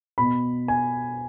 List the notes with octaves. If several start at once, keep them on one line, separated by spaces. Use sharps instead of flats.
B2 B3 B5
G#5